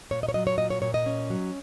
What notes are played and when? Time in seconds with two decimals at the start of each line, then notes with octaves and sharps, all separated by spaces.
0.11 A#2 C#5
0.23 D#5
0.29 C#5
0.34 F#3 D#5
0.47 C#5
0.58 A#2 D#5
0.70 C#5
0.82 A#2 C#5
0.94 D#5
1.06 C#4
1.30 F#3